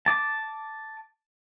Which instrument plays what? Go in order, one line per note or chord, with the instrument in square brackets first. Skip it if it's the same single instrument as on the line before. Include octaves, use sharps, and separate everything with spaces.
[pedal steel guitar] A5 D6